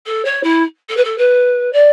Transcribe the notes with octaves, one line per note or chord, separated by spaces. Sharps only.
A4
C#5
E4
A4
B4
A4
B4
D5